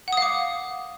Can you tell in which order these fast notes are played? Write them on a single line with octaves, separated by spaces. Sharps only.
F#5 D#6 F5 D6